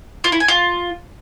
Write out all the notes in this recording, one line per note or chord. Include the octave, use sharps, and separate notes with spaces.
F4
E4
G#5
F4